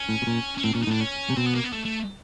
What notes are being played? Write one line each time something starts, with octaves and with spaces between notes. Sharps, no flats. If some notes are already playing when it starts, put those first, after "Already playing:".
Already playing: C#4
A2
B2
A#2
C#4
A2 C4
A#2 C#4
D#4
A2 D4
C#4
C3
B2 C4
B3
A#3
B3
A3
A3